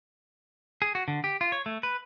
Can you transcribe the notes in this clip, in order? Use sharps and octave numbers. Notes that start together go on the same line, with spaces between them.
G#4
F#4
D3
G4
F4
C#5
A3
B4